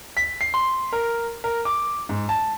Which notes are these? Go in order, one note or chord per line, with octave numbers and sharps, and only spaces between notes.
B6
C7
C6
A#4
A#4
D6
G#2
A5